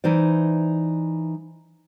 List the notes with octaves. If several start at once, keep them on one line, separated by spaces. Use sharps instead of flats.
E3 D#4 C5 D5